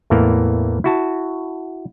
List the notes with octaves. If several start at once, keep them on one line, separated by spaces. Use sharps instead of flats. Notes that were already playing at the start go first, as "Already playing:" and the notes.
E2 A2 E3 A#3 A#4
E4 F#4 A5